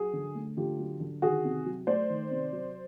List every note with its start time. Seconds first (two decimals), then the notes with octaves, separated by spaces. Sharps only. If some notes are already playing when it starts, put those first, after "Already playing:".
Already playing: F#3 F#4 G#4
0.13 D3
0.35 A3
0.57 D3 F4 G4
0.79 F#3
1.00 D3
1.22 D#3 F#4 G#4
1.45 C3
1.66 F#3
1.87 A3 C5 D5
2.10 D#3
2.31 C3
2.53 F#3